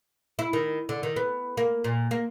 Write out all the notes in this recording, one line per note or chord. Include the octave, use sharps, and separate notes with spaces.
E4
D#3
D3
D#3
B3
A#3
A#2
A#3